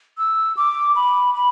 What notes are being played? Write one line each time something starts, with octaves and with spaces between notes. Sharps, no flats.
E6
D6
B5
B5